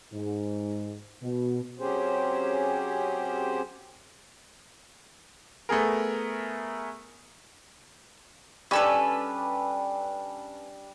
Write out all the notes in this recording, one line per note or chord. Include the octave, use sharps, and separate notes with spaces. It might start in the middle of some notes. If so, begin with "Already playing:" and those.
G#2
B2
F#3 C4 C#4 G4 G#4 C5
A3 B3 G#4 A#4
G3 C#4 D4 A4 B4